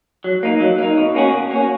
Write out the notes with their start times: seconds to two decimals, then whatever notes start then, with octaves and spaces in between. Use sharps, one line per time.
0.24 F#3
0.43 A#3 D#4
0.60 F#3
0.78 A#3 D#4
0.97 B2
1.15 A#3 C#4 F#4
1.33 B2
1.51 A#3 C#4 F#4